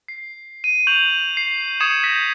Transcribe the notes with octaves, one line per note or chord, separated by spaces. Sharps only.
C7
D#7
C#6 G6 F7 F#7
C7
C#6 D#6 G#6 C7 C#7 E7
G6 G#6 A#6 B6